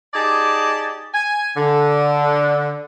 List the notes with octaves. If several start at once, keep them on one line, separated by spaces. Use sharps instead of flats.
D#4 G4 G#4 D5 G#5 A5
G#5
D3